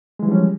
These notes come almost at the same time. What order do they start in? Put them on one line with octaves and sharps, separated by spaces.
G#3 E3 G3 F3 C#4